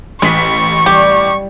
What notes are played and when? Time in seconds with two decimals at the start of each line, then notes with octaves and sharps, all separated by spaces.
0.22 A1 G#3 C#6 B6
0.86 G3 G4